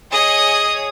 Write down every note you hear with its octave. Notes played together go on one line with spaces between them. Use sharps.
G#4 C#5 D#5 D#6